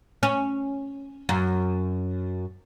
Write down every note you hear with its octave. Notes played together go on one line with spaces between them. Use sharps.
C#4
F#2